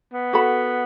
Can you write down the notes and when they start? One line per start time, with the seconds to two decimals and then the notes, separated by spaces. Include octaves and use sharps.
0.14 B3
0.33 F#4 A4 F#5 B5